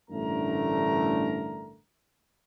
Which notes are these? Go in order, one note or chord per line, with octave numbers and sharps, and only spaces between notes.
A1 G2 D3 A3 A#4 A#5